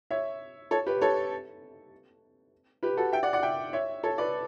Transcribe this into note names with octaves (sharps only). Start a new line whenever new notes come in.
C#5 E5
A4 C#5
G4 B4
A4 C#5
G4 B4
F#4 A4
E5 G5
D5 F#5
D5 F#5
E5 G5
C#5 E5
A4 C#5
B4 D5